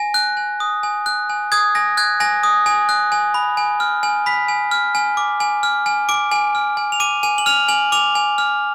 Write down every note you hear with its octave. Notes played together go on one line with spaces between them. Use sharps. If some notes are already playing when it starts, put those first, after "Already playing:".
Already playing: G#5 A#6
F#6
G#5
D#6
G#5
F#6
G#5
D#6 G#6
G#5 A#6
F#6 G#6
G#5 A#6
D#6
G#5
F#6
G#5
B5
G#5
F6
G#5
B5 B6
G#5
F6
G#5
D6
G#5
F6
G#5
D6 D7
G#5
F6
G#5
F7
D6 D#7
G#5 D#7
F#7
F6 F7
G#5 F#7
D6 F7
G#5
F6